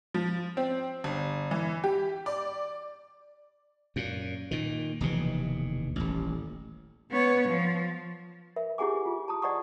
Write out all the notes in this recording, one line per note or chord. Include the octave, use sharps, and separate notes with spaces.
F3
C4
G1
E3
G4
D5
F#2 A#2
A#2 D#3
F1 D#2 B2 E3
D#1 A1
B3 C#5
F3
A#4 E5
E4 G4 G#4 F#5 G#5 D6
F4
A5 A#5 D#6
D5 D#5 F#5 A#5 C#6 D#6